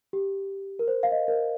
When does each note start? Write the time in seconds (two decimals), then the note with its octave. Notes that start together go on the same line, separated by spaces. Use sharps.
0.13 G4
0.79 A#4
0.88 C5
1.03 F5
1.11 D#5
1.28 A#4